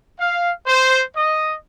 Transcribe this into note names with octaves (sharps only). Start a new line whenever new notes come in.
F5
C5
D#5